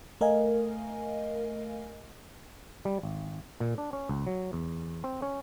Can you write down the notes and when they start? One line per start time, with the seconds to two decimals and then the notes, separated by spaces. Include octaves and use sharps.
0.21 A3 A#4 D#5 F5 G#5
2.85 G3
3.03 G#1
3.60 A#2
3.78 D4
3.93 C#4
4.09 C#2
4.27 F#3
4.53 E2
5.04 C4
5.22 C#4